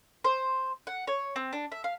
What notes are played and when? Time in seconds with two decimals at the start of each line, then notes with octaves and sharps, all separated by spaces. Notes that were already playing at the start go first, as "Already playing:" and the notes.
0.24 C5
0.87 F#5
1.07 C#5
1.36 C4
1.53 D4
1.72 E5
1.84 F5